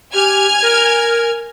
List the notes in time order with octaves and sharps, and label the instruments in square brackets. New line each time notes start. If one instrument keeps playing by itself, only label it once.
[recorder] G4 [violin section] G#5 F6 G#6
[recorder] A#4